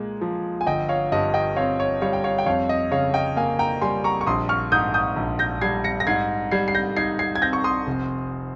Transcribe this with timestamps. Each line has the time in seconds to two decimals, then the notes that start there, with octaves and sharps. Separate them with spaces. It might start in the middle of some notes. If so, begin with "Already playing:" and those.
Already playing: A#2 G#3
0.21 F3
0.61 G#5
0.67 G1 D#5 G5
0.89 C#5 F5
1.12 G2 D#5
1.34 D#5 G5
1.56 C4 C#5 F5
1.80 C#5
2.01 G3 C#5 F5
2.13 G5
2.24 C#5 F5
2.38 G5
2.46 F2 C#5 F5
2.69 D#5
2.91 C#3 C#5 F5
3.14 D#5 G5
3.36 A#3 F5 G#5
3.59 G5 A#5
3.82 G3 G#5 C6
4.04 A#5 C#6
4.21 C#6
4.27 A#1 C6 D#6
4.49 C#6 F6
4.72 G#2 D#6 G6
4.94 D#6 G6
5.16 A#1
5.39 G6 A#6
5.61 G3 G#6 C7
5.84 A#6 C#7
6.00 A#6
6.07 G#2 G#6 C7
6.52 G3 G#6 C7
6.68 C7
6.75 G6 A#6
6.96 D#4 G#6 C7
7.19 G#6 C7
7.36 G#6
7.42 C4 G6 A#6
7.53 C#6
7.64 C6 D#6
7.87 F1